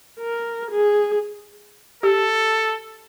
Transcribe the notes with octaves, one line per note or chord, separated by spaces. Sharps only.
A#4
G#4
G4 A4